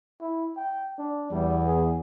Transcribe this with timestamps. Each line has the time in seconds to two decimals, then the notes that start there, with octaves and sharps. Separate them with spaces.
0.21 E4
0.57 G5
0.99 D4
1.31 E2 G3
1.67 G#4